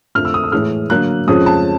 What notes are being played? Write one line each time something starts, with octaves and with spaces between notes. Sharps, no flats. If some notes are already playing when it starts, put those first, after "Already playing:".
F2 D3 F3 A3 F6
E6
D#6
E6
A2 E3 G#3 F6
D3 F#3 A#3 F#6
F2 C#3 F3 G#3 C#4 D#6
A5